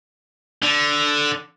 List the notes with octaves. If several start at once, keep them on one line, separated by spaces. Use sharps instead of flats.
D3